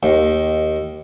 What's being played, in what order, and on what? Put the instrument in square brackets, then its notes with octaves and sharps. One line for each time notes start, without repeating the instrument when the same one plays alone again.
[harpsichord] D#2